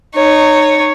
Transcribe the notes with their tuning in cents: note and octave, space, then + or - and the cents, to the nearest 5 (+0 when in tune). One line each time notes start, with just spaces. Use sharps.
D#4 -20 C#5 +0